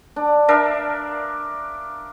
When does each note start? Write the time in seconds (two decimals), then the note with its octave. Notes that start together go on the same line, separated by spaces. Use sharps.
0.16 D4
0.48 D4 A#4 E5 F5